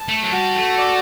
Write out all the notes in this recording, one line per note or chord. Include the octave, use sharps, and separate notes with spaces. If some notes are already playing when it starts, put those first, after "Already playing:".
Already playing: A5
A3
F#3
G3 F#4
A3
D5